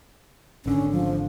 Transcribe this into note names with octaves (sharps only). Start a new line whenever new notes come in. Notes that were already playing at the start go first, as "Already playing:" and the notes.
G#1 D3 C#4
F3